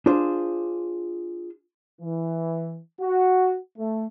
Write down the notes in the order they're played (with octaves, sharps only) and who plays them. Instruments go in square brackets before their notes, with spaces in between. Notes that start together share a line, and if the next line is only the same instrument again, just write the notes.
[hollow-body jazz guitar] D4 F4 G#4 C5
[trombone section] E3
F#4
A3